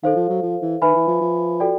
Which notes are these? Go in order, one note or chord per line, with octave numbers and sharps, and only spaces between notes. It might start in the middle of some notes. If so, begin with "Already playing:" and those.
D#3 A4 C5 F5
F3
F#3
F3
E3
D#3 B4 E5 G#5 B5
E3
F3
F3
F#4 A4 D5 G5